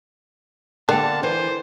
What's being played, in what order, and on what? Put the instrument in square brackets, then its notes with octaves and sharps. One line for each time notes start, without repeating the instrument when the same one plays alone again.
[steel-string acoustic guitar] D3 A#3 [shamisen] D4 [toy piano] A#4 G5 [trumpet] A5
[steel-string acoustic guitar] E3 [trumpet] C5